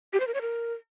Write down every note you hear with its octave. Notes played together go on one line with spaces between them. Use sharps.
G4
C5
A#4
C#5
A#4